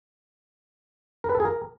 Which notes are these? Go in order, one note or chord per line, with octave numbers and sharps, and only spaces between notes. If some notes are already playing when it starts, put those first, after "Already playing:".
A#4
B4
A4
G#4
A#4